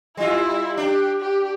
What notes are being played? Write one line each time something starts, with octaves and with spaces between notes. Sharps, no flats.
G3 E4 F4
D4 G4
G4